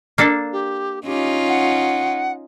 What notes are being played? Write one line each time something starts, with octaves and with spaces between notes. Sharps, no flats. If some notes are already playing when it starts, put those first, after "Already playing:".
A#3 D4 A4
G4
C#4 D#4 F4 G4
F#5